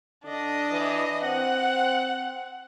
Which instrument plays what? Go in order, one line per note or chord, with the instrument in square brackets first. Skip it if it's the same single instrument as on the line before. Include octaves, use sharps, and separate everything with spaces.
[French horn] D3 [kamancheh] D4 D#5
[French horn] E3
[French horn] C4 [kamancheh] F#5